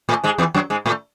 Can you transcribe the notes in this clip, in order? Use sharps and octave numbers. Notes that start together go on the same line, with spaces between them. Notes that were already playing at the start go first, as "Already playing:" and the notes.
A2 A3
G#2 G#3
E2 E3
F#2 F#3
G#2 G#3
A2 A3